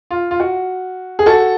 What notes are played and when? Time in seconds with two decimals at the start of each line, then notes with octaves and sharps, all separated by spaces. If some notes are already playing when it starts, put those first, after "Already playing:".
0.11 F4
0.31 F4
0.40 F#4
1.19 G#4
1.26 F#4 A4